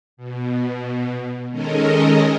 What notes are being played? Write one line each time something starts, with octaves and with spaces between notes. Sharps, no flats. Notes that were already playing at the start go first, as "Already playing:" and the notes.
B2
D#3 G#3 C#4 A4 A#4 D#5